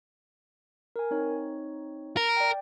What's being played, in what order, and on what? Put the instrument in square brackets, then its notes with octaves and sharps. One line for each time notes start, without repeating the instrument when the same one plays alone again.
[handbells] A#4 G#5
C4 D#4 C#5
[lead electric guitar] A#4
[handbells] D5 G5